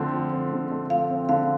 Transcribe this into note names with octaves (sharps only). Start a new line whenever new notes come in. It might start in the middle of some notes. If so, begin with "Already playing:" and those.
Already playing: D3 F3 A3 C4
F3
C4
D3
A3
F3 F5
C4
D3 F5